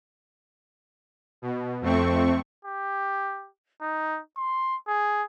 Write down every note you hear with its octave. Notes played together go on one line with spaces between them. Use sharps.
B2
F2 A3 C4 C#6
G4
D#4
C6
G#4